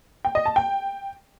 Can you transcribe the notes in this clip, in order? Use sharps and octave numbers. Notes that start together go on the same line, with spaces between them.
G5
D#5
A5
G5